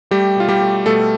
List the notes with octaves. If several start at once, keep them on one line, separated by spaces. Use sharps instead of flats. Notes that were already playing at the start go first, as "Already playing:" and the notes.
G3 A3 G4
B2 F4
G3 G4
A3
B2 A3 A4